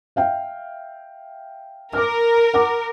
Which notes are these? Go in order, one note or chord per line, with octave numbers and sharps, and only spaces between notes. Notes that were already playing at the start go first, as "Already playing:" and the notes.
E5 F5 G5
A#4 D6 F6
F#5 D6